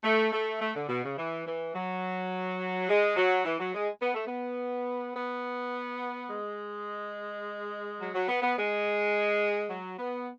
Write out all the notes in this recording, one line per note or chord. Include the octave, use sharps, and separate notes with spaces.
A3
A3
A3
D3
B2
C#3
E3
E3
F#3
G#3
F#3
E3
F#3
G#3
B3
A3
B3
B3
G#3
F#3
F#3
B3
B3
G#3
F#3
B3